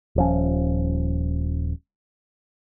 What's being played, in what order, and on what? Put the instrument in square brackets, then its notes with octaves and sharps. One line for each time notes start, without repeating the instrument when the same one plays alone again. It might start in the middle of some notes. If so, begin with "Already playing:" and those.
[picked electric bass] D#1 F3 C#4